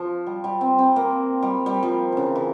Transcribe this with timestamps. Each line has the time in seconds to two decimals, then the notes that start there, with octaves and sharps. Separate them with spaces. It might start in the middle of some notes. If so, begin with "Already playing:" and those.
Already playing: F3
0.27 G3
0.44 G3
0.61 C4
0.78 C4
0.96 A#3
1.42 G3
1.66 G3
1.83 F3
2.12 C#3 E3
2.36 E3